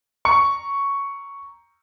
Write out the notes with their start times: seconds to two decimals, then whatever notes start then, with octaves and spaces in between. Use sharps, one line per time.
0.25 A#5 C#6 C#7